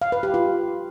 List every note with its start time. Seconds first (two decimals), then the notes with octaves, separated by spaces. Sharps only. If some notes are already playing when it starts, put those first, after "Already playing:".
0.02 F5
0.12 B4
0.23 G4
0.34 F4